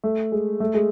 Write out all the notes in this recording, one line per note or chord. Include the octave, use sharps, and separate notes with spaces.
A3
G#3
A3
G#3